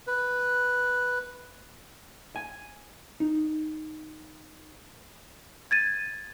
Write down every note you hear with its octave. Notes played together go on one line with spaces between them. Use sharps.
B4
G#5
D#4
G#6 A6 D#7